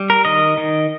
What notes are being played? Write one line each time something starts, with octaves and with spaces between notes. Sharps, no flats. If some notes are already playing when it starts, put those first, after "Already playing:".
Already playing: G3
A#4
D#3 D#5
D#3